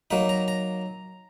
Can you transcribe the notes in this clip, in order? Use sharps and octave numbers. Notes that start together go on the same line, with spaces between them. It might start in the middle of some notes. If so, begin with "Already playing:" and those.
F#3 A#3 D#4 B5
A#5
A#5